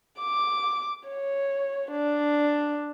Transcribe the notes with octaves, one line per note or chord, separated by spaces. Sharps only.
D6
C#5
D4